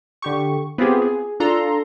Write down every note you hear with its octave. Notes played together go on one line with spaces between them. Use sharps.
D3 G4 C#6
B3 C4 F4 G4 G#4
G#4
D4 F4 A4 A#5 C6